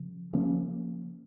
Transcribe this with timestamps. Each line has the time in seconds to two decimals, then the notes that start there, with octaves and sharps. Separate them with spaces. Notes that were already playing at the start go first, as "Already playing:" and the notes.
Already playing: C#3 F3
0.33 C#3 F3 A#3 C#4